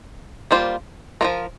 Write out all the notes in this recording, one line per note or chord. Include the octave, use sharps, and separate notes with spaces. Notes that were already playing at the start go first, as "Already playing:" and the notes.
G3 A#3 F4 C5
F3 A#3 F4 A#4